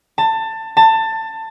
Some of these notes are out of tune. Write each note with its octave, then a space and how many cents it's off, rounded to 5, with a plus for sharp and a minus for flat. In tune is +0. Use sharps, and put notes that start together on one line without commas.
A5 +20
A5 +20